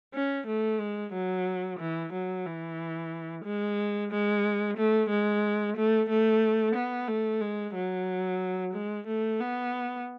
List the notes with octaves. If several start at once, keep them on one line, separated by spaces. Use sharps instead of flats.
C#4
A3
G#3
F#3
E3
F#3
E3
G#3
G#3
A3
G#3
A3
A3
B3
A3
G#3
F#3
G#3
A3
B3